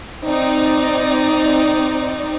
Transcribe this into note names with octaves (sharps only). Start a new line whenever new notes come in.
C4 D#4 D5